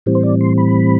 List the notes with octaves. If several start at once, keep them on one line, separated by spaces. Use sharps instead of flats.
A2 E3 G3 C4
C5
D5
C6
B5